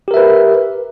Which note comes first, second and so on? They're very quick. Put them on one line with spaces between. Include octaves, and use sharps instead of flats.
G4 A#4 E5 B4